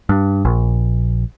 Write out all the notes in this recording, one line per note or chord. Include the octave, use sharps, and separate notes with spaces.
G2
A#1